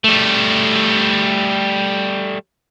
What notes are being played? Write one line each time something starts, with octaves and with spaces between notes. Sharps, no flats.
G3 A3